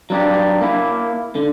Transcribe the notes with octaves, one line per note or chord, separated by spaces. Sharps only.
F#3 D4 G4
A#3 E4
D3